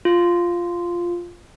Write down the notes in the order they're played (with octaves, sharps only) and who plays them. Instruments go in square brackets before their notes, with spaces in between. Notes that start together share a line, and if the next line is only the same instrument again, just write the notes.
[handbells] F4